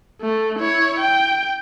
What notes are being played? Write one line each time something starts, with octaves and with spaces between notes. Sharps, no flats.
A3
E4 C#5
G5